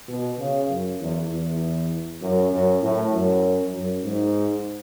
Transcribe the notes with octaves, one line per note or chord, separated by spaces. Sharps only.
B2
C#3
F#2
E2
E2
F#2
F#2
A2
F#2
F#2
G#2